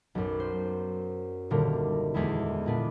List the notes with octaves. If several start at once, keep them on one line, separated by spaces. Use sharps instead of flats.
B1 F#2
C5
D#1 D3 A#4
E2 D3 G#3 E4
A#2 B3 D4